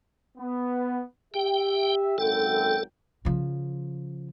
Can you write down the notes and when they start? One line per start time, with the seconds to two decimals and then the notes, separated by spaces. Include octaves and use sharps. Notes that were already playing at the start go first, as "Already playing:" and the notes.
0.38 B3
1.34 G4 E5 G5
2.18 G#1 F#2 A4 G5
3.25 C#3 F3